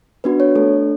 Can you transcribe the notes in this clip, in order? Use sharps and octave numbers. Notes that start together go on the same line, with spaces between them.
B3 D4 F#4 B4
C#5
A3 D4 A4